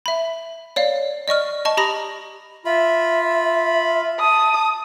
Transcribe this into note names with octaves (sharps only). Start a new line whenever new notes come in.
E5 B5
C#5 D5 F5
D5 D#5 C#6 F6
D#5 A5 C#6
G4 A#5 B5 D#6 A#6
F4 E5 B5
A5 D#6